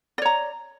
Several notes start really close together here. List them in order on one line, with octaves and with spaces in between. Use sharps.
D5 C#5 A#5